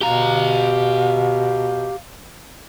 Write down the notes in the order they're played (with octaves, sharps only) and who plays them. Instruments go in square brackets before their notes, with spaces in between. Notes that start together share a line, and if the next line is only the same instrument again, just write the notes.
[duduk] B2 [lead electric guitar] G4 A#5 [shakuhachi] F5